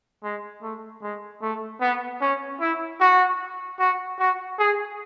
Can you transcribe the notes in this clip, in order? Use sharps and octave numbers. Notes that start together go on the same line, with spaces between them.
G#3
A3
G#3
A3
B3
C#4
E4
F#4
F#4
F#4
G#4